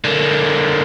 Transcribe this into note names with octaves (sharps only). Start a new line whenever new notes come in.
D3 A#3